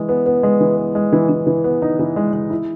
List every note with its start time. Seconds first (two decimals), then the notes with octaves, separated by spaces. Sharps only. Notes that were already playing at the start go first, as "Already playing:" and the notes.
Already playing: E3 G#3
0.09 B3
0.26 B3
0.43 G#3
0.61 E3
0.77 B3
0.95 G#3
1.13 E3
1.29 E3
1.47 E3
1.64 B3
1.82 D#4
1.99 E3
2.16 G#3
2.33 G#3
2.50 E4